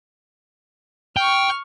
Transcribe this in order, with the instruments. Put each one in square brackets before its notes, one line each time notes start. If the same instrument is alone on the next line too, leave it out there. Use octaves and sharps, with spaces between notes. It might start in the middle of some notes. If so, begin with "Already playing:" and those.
[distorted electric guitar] G5 [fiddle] C#6 F6